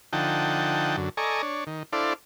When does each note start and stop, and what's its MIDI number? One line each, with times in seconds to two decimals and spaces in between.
0.13 0.96 50
0.13 0.96 53
0.13 0.96 63
0.13 0.96 78
0.13 0.96 79
0.13 0.96 81
0.97 1.09 42
0.97 1.09 50
1.17 1.42 69
1.17 1.42 74
1.17 1.42 75
1.17 1.42 80
1.17 1.42 82
1.17 1.42 85
1.43 1.64 62
1.43 1.64 73
1.67 1.83 51
1.93 2.13 62
1.93 2.13 64
1.93 2.13 69
1.93 2.13 72
1.93 2.13 74
1.93 2.13 77